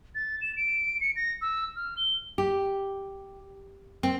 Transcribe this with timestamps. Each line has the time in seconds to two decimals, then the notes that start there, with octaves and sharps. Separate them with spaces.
0.15 A6
0.41 E7
0.57 D7
1.01 C#7
1.16 A#6
1.42 E6
1.76 F6
1.97 G7
2.38 G4
4.03 C4